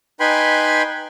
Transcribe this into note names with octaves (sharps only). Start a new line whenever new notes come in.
D#4 B4 G5 G#5 B5 C6